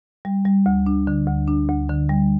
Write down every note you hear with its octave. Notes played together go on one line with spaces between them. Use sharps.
G3
G3
D2
D4
D3
D2
D4
D2
D3
G3